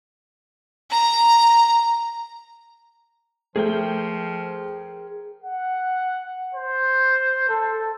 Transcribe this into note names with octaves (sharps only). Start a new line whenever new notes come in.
A#5
F3 A3 G#4 A#4 G5
F#5
C5
A4